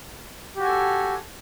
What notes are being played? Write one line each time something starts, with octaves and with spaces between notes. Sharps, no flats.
F#4 G4 A4 G#5